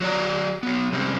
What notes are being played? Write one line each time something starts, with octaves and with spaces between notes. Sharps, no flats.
F#3 F#4 D5 A#5
F#3 B3
C3 G3 G#3 C4 C#4